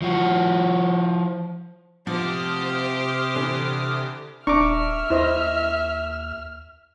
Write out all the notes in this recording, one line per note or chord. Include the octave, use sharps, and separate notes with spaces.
F3 F#4
C3 F3 G4 C5 F#5 D6 D#6 F6
D3 E3
D#1 D4 E5 A#5 C#6 D6 F6
D#2 E4 C5 D#5